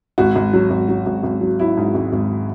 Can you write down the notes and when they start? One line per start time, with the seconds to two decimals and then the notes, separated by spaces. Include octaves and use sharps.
0.18 G#1 F#4
0.35 G#1
0.53 F#3
0.70 G#1
0.89 F#3
1.06 G#1
1.23 G#1
1.41 F#3
1.60 F#3 E4
1.77 G#2
1.95 G#1
2.13 G#1